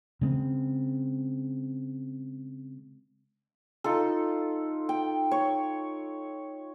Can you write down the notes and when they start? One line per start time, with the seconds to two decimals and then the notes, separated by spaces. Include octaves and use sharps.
0.21 C#3 G#3 C4
3.84 D#4 F4 A4
4.89 G5
5.31 C#5